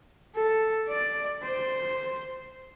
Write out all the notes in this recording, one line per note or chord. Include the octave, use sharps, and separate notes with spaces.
A4
D5
C5